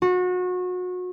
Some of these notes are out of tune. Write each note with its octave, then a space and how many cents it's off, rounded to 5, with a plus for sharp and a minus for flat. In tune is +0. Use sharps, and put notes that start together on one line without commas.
F#4 -30